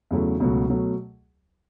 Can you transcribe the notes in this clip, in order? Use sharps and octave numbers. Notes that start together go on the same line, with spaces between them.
E2 C#3 F#3 A3
C#2 B2 F#3 A3 F#4
B2 F#3 A3